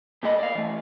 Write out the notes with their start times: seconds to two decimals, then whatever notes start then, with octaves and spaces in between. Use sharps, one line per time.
0.23 A#2 A3 A4 D#5 B5
0.39 D5 F5
0.55 E3 A3